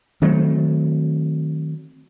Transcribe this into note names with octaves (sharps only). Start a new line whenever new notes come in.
D#3 F#3 A3 C4